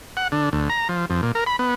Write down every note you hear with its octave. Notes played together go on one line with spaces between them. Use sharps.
F#5
D3
D2
A#5
F3
F2
A#2
A#4
B5
B3